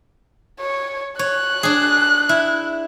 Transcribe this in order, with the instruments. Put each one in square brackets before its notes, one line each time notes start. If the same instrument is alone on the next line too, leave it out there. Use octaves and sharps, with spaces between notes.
[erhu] C#5
[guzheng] C#5 [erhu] F#6
[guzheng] D4 G#4
E4